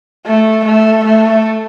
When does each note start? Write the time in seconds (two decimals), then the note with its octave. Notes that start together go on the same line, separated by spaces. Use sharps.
0.26 A3
0.65 A3
1.06 A3